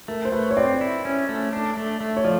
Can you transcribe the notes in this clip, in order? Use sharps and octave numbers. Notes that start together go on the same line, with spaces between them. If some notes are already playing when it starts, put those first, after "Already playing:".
A3 A#4
C5
A3 B4
C#5
C4 D5
E4
C#4
A3
D4
A3
A3
C#5
F3 D5